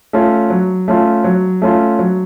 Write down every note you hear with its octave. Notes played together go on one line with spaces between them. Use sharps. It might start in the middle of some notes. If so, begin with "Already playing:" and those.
A3 C#4 F4
F#3
A3 C#4 F4
F#3
A3 C#4 F4
F#3